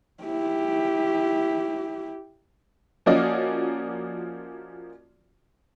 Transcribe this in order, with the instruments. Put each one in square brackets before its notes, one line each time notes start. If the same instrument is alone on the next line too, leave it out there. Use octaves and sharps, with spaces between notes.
[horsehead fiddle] E4 G4
[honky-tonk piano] F3 A#3 C#4 F#4 D5 D#5